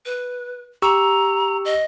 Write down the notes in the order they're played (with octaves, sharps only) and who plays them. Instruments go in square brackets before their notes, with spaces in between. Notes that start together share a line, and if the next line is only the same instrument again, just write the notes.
[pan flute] B4
[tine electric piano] G4 C#6 E6 [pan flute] A#5
[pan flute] D#5